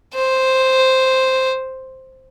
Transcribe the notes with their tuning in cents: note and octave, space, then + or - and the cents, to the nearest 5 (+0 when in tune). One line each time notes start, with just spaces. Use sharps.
C5 +0